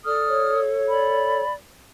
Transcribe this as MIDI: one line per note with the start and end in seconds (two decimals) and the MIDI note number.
0.05 1.42 69
0.05 0.61 74
0.05 0.61 87
0.05 0.61 89
0.29 1.43 73
0.89 1.54 74
0.89 1.54 83